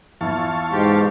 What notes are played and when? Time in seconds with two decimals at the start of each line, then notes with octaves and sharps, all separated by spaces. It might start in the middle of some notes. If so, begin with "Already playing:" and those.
0.21 E2 E4 F4 F5 A5 C#6
0.72 G#2 B2 G4 C6